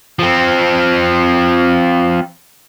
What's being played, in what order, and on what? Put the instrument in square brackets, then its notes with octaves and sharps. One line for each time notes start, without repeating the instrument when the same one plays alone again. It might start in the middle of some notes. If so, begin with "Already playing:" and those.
[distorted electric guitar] F3 C4